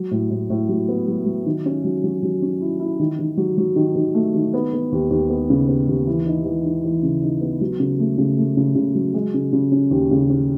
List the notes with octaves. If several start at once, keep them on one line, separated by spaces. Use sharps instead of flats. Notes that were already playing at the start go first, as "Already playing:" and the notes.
Already playing: F#3
A2
A2
A2
F#3
B3
F#3
F#3
D#3
C#4
F#3
F#3
F#3
C#4
E4
E4
D#3
D#3
F#3
F#3
D#3
D#3
A3
D#3
B3
B3
D#2
D#2
B3
C#3
B3
D#2
E3
D#4
E3
D#4
E3
C#3
D#4
B3
F#3
C#3
A3
C#3
A3
C#3
C#3
F#3
G#3
C#3
C#3
C#4
D#2
C#3
C#4